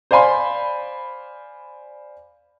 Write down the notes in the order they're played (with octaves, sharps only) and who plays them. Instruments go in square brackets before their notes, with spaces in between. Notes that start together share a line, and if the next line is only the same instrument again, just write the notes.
[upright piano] C5 D5 F5 G#5 B5 C6